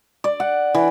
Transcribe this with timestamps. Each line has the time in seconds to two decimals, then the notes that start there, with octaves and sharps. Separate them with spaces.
0.24 D5
0.40 F#5
0.75 E3